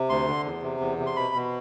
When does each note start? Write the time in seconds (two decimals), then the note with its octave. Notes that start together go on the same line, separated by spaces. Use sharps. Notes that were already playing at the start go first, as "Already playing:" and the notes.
Already playing: C3
0.09 D2 C6
0.27 D3
0.45 E2
0.63 C3
0.80 E2
0.99 C3
1.06 C6
1.16 B2 B5
1.34 B2